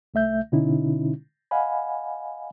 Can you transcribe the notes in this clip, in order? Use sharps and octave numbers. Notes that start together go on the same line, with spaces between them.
C2 A3 E5 G6
B2 D3 C#4 D#4 E4
D#5 F5 F#5 G#5 B5